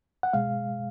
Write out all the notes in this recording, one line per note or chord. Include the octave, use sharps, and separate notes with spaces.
F#5
B2 G#3 F5